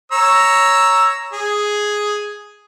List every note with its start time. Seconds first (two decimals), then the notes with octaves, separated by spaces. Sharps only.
0.12 C#5 A#5 E6
1.33 G#4